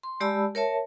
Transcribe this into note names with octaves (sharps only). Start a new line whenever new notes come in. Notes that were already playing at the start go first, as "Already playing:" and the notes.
C6
G#3 G4 D5 A5 B5 E6
A#4 C#5 E5 A5